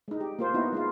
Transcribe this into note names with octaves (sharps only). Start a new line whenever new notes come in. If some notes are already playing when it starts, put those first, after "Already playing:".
G#3 D#4
G4
A#3 F4 C5
B3 D#4 E4 F#4
G#3 D#4 F4